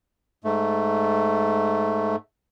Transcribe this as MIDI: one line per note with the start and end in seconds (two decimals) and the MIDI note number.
0.44 2.16 44
0.44 2.16 57